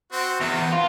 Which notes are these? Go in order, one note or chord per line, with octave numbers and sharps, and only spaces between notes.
C4 F#4
E2 D#3 B3
F4